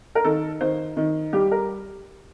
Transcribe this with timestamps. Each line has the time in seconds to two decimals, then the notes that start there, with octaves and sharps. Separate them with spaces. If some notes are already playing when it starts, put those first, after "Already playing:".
0.15 A#4
0.24 D#3 A4
0.61 D#3 C5
0.97 D#3
1.33 G3 G4
1.51 A#4